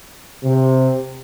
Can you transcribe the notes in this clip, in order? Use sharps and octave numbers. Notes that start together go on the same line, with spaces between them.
C3